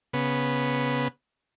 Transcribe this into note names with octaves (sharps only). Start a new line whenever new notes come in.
C#3 B3